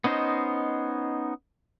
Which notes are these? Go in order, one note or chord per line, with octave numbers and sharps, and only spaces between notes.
B3 C#4 D#4 C5 D#5